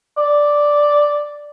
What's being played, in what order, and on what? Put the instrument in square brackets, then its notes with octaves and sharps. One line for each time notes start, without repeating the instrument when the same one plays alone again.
[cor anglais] D5